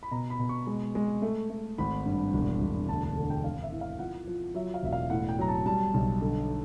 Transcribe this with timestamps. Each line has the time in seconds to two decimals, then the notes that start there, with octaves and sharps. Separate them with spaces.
0.03 B5
0.11 B2 A#5
0.30 B5
0.39 B2
0.49 C#6
0.67 G#3
0.95 G#3
1.22 A3
1.50 A3
1.78 G#1 B5
2.06 G2
2.33 E1
2.61 E1
2.89 D2 A5
3.03 A5
3.16 D3
3.30 G5
3.44 G#1 F5
3.62 E5
3.72 E3
3.81 F5
3.99 F3 F#5
4.27 F3
4.54 F#3 E5
4.74 F5
4.83 E1 E5
4.93 F5
5.10 A2 F#5
5.29 G5
5.39 F#3 A#5
5.48 A5
5.66 G3 A5
5.94 B1
6.21 D3